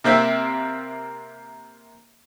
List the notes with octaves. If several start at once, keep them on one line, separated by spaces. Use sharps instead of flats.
C3 A#3 C4 E5